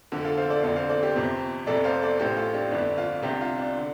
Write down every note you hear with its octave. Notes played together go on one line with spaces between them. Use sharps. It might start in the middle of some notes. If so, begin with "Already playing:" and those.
F1 F2 D3
F4 A4
C5 F5
A4 D5
F1 F2 D3 A4 D5
C5 F5
A4 D5
G4 C5
G1 F2 C3
F1 F2 C3 A4 D5
C5 F5
A4 D5
A1 A2 G4 C5
F4 A4
D4 G4
G1 F2 D3 D4
F4
C2 C3 D4 G4
F4
D4
D3